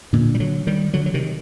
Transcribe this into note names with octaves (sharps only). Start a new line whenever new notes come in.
A#2 D3
G3
D3 F#3
D#3 G3
D3 F#3
F#3
C3 D#3